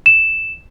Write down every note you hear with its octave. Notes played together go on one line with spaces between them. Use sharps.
E7